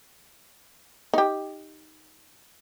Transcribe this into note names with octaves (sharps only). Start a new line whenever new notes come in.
D#4 G4